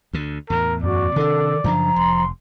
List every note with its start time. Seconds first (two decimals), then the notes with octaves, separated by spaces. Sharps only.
0.13 D2 D3
0.50 E2 A2 A#4
0.84 F#2 F#4 D5
1.16 C3 D#3 D4 A4
1.64 F#2 C#3 F3 D4 A#5
1.96 F1 C6